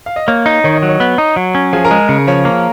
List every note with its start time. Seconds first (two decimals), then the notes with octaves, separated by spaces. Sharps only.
0.06 F5
0.16 D#5
0.27 A#3 C#5
0.46 D#4
0.64 D#3 C#5
0.76 D#5
0.83 F#3
0.89 C#5
1.00 B3
1.18 D#4
1.36 F#3
1.55 C#4
1.73 F3 G#4 G#5
1.84 A#4 A#5
1.91 G#3
2.09 C#3
2.28 F3 C#5
2.45 A#3